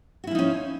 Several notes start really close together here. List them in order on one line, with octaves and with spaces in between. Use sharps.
F#4 E4 F3 D#4 C#4